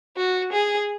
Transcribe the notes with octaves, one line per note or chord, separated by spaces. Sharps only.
F#4
G#4